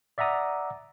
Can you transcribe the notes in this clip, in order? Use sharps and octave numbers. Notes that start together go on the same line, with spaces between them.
D5 E5 F#5 A#5 D#6